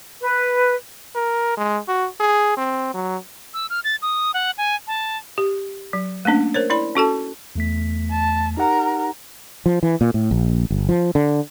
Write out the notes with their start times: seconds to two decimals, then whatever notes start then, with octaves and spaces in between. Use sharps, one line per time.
0.21 B4
1.15 A#4
1.57 G#3
1.88 F#4
2.20 G#4
2.57 C4
2.94 F#3
3.54 E6
3.70 F6
3.84 A6
4.02 D#6
4.34 F#5
4.58 G#5
4.87 A5
5.38 G4
5.93 F#3
6.25 A3 A#3 C#4 D4
6.54 A#4 C5 C#5
6.70 E4 D5 B5
6.95 C#4 F#4 A4 A5
7.56 E2 A3 B6
8.10 A5
8.57 D#4 G4 A#4 F#5
9.66 F3
9.83 E3
10.01 A#2
10.14 A2
10.31 A#1
10.70 G1
10.89 F3
11.15 D3